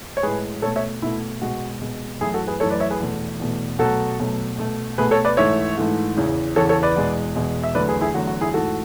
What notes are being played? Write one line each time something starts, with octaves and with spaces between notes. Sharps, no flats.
C#5
A2 G#3 G#4 B4
B2 A3 A4 C#5
C#5 E5
B2 A3 E4
B2 G#3 F#4
B2 G#3
F#2 E3 A3 E4 G#4
F#4 A4
G#4 B4
F#2 E3 A3 A4 C#5
B4 D5
C#5 E5
G#4 B4
E2 B2 A3
E2 B2 A3
B2 F#3 A3 F#4 A4
B2 F#3 A3
B2 A3
B2 A3 G#4 B4
A4 C#5
B4 D5
G#2 E3 A3 C#5 E5
G#2 E3 A3
E2 C#3 E3
E2 C#3 E3 A4 C#5
A4 C#5
B4 D5
E2 B2 G#3
E2 B2 G#3
E5
E2 D3 F#3 A3 B4 D5
G#4 B4
E4 G#4
E2 D3 F#3 A3 F#4
F#4
E4 G#4
G#2 E3 A3 F#4 A4